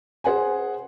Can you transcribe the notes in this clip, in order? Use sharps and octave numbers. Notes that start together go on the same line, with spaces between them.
G#4 C5 F#5 G#5